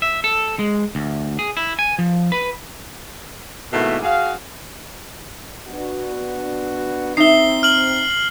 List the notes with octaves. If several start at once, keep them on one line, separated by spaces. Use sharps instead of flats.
E5
A4
G#3
D2
G#4
E4
G#5
F3
B4
G#2 B2 D#3 A3 A#3 E4
F#4 G#4 D#5 F5
B3 D4 F#4
C4 D#4 E5 C7 G7
F6 F#7